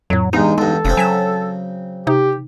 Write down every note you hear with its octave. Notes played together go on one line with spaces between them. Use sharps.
F2 A2 F#3
E2 G2 G#3 B3 D#4
E2 G2 G#3 A4
F1 C#3 C4
F#3 G#5 B6 E7
C3 D#4 G4